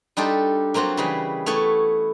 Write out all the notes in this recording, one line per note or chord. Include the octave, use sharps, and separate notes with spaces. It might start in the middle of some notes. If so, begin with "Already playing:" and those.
G3 D4 D#4 F4 G4 A4
F#3 A#3 C4 F4 F#4
C#3 E3 G3 G#4 B4
A3 B3 E4 C#5 A5